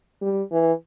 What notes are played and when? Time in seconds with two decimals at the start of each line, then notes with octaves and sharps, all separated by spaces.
0.22 G3
0.52 E3